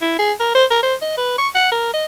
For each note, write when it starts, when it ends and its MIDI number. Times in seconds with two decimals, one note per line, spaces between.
0.02 0.17 64
0.19 0.32 68
0.40 0.51 70
0.55 0.64 72
0.70 0.79 70
0.83 0.94 72
1.02 1.15 75
1.17 1.38 71
1.38 1.48 85
1.55 1.68 78
1.72 1.92 70
1.93 2.06 75